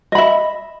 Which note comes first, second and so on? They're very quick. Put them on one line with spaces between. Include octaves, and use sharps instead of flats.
D#5 B5 E5